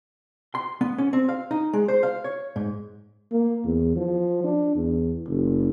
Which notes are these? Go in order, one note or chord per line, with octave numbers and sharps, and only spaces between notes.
C6
B3
C#4
C4
F5
D#4
G#3
C5
F5
C#5
G#2
A#3
E2
F3
D4
E2
F#1